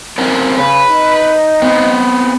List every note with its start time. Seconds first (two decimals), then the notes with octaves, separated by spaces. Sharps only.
0.18 C4 C#4 A#4
0.58 C#3 B4
0.89 D#4
1.62 B3 C4